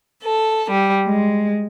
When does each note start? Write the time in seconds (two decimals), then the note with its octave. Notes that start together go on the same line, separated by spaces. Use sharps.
0.23 A4
0.69 G3
1.05 G#3